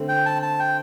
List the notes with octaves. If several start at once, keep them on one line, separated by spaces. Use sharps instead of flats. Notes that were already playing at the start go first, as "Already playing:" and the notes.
Already playing: D3 A3 C4
G5
A5
A5
G5